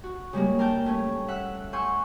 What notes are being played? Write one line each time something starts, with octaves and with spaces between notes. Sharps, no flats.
F#4
C#3 G3 G#3 A#3
D4 A#4 G5 A5 G6
A3 C#4
E5 F#5 F#6
F#5 G#5 C6 C#6 E6 G6